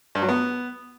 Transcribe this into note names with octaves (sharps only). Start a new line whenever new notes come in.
G2
F#3
B3